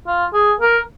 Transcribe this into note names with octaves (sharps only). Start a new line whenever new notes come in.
F4
G#4
A#4